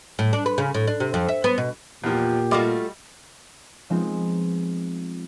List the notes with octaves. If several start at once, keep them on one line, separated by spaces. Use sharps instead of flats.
A2
D4
B4
C#3
A2
D4
C3
F2
E5
B3
B2
E2 A#2 F3 G4
G3 A3 F4 F#4 D#5 D6
F3 G#3 B3 C4 D#4 F4